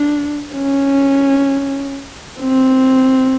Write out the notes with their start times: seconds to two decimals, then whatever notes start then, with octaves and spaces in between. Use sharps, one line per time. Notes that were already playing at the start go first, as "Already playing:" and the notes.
Already playing: D4
0.54 C#4
2.40 C4